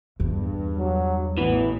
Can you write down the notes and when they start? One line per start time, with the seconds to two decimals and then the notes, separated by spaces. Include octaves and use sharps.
0.20 E2 G2
0.78 F#3
1.38 A1 E3 B3